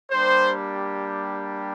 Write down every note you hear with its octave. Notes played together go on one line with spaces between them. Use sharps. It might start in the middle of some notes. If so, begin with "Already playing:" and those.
G3 A#3 D4 G4 C5